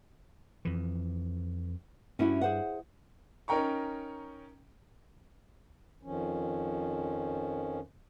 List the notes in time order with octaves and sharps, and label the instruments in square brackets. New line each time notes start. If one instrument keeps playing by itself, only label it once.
[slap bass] F2 E3
[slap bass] G2 [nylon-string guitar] C#4 E4 F#4
[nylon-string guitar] G#4 C5 F#5
[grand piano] C#4 D#4 A#4 G5 A#5 C#6
[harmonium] F2 D#3 F3 C#4